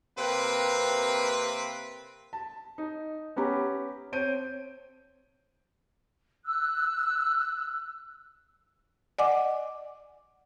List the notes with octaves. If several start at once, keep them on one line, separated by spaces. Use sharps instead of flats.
C3 A#3 C4 B4
A5
D#4
B3 C#4 G4 A#5
C4 C5 C#5 G6 D7 D#7
E6 F#6
D5 D#5 F#5 G#5 D6